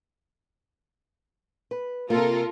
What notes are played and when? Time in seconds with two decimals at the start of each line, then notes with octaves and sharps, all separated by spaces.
1.71 B4
2.10 C3 A#3 F4 A4 A#4